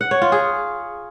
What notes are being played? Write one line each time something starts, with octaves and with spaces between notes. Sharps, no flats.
F#5
C#5
F4
G#4